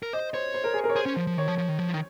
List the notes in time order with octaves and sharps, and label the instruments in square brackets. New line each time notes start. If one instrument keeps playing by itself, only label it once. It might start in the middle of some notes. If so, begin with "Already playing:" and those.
[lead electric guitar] A#4
[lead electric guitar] C5 [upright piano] D#5
[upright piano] C5 [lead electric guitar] C#5
[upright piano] C5
A#4
G#4
A#4
C#5
[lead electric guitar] G#4 [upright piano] C5
[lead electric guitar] C#4
F3
F3
[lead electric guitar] D#3 [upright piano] C#5
[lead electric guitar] F3
F3
D#3
F3
D#3